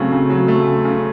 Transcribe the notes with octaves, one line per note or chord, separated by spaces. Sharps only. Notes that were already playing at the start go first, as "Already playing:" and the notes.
Already playing: C#3 F#3 A3 C4
C#3
F#3
A3
C#3
C#3